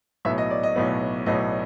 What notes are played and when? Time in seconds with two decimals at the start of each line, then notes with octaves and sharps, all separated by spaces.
0.25 B1 A2 F#3 B3 E5
0.38 D#5
0.51 D5
0.63 D#5
0.76 B1 A2 F#3 B3
1.26 B1 A2 F#3 B3 D#5